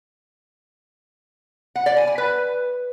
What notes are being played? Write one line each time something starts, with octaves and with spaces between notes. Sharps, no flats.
F#5
D5
G#5
G#5
B4